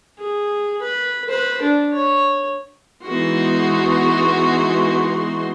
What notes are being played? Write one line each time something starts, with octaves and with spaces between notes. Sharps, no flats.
G#4
B4
B4 C5
D4
C#5
E3 G#3 B3 D#4 F#4 C6